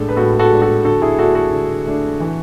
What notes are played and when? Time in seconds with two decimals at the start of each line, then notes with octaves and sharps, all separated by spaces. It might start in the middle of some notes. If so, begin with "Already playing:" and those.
Already playing: A2 G#3 D4 A4
0.09 B4
0.16 A2 F#4 A4
0.39 F#4 A4
0.50 G#3 D4
0.62 F#4 A4
0.85 D3 F#4 A4
1.02 E4 G#4
1.19 A3 D4 F#4 A4
1.35 F#4 A4
1.52 D3
1.87 A3 D4
2.20 E3